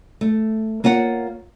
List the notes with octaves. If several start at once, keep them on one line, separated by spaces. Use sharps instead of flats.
A3
A#3 F4 C#5 F#5